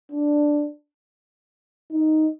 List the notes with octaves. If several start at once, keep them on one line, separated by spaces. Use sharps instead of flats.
D4
D#4